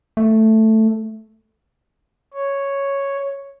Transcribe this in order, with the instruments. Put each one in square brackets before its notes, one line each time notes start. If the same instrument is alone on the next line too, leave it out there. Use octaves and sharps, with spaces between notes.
[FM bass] A3
[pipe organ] C#5